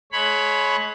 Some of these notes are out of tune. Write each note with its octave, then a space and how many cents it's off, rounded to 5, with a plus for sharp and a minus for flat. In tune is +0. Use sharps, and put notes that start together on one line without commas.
G#3 +35 C#5 +0 B5 +5